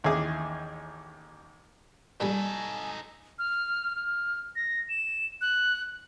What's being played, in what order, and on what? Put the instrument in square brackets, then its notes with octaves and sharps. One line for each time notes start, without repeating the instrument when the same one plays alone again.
[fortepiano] A1 D#2 C#4 E4 G#4 D6
[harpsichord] A#2 D3 G3 [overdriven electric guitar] D#4 A4 [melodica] G#5
[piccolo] F6
F6
A#6
E7
F#6